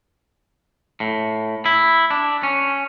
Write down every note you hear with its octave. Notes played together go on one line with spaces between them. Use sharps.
A2
E4
D4
C#4